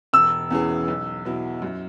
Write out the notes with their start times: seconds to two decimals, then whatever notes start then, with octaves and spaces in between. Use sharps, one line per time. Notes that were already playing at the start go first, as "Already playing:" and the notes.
0.13 E1 E6
0.51 E2 E3 C#4 G#4
0.88 B1
1.25 B2 F#3 E4
1.62 F#2